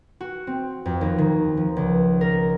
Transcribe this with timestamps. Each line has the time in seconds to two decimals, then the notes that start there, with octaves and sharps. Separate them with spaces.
0.21 F#4
0.47 C4
0.86 F2
1.01 D#2
1.18 D#3
1.57 F3
1.77 C#2
2.21 A#4